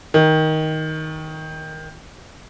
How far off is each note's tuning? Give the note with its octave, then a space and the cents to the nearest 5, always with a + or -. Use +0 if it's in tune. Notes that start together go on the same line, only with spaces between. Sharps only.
D#3 +10